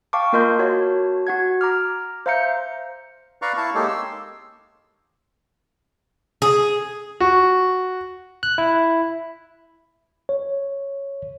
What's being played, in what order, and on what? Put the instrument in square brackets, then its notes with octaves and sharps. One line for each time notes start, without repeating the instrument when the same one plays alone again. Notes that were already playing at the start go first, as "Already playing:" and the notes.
[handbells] F5 G5 A5 C#6 D6
A#3 F4 A#4 D#5 C6 G6
F#4 C#5 A5
F#4 F#5 G#6
A#5 D6 F6
C5 E5 F5 A#5 G6 C#7
[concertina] B4 D5 F5 A#5 C#6
E4 F5 A5 C#6
G#3 A#3 D#4 G4 A4 C#5
C6 E6
[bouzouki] G#4
[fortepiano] F#4
[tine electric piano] F#6
E4
C#5